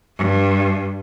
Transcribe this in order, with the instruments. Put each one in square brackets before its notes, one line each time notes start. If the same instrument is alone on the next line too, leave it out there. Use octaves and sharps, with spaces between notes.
[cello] G2